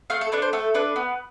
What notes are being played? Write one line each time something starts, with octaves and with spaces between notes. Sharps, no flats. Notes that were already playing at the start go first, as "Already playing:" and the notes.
A3 F5
A4
D4 A4 B4
C5
A3 A4
D4 A4 B4
B3